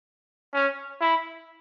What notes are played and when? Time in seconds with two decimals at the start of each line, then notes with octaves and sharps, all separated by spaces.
0.53 C#4
1.01 E4